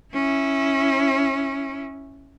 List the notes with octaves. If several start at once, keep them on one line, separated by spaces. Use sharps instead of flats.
C#4 E4